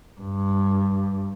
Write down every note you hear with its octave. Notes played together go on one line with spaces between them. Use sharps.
G2